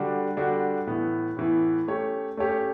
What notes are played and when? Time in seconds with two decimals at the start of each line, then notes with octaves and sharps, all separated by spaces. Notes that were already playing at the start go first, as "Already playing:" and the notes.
Already playing: D3 G3 D4 F#4
0.37 D3 G3 D4 F#4
0.87 A2 E3 B3
1.37 A2 E3 B3
1.88 A3 C#4 G4 C#5
2.37 A3 C#4 G4 C#5